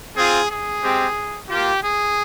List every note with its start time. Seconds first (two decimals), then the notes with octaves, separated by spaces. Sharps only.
0.17 C4 F4 G#4
0.49 G#4
0.83 G#3 C4 G4
1.49 A#3 F4 G4
1.82 G#4